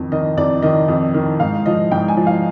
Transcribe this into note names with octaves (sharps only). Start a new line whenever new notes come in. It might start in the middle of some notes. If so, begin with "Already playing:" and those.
Already playing: F2 D#3
D#3 D#5
F2 D5
D#3 D#5
F2
D#3
G#2 F5
F3 D#5
G#2 G5
G#5
F3
F5